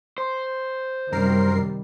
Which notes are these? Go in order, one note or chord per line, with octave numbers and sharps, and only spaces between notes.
C5
F#2 C3 D#3 G3 A#4 C7